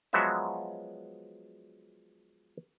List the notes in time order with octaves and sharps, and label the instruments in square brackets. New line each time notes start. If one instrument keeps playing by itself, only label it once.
[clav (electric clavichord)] F3 F#3 G#3 B3 F#4 E5